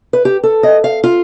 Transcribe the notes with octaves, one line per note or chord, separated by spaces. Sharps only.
B4
G4
A4
D#5
F5
F4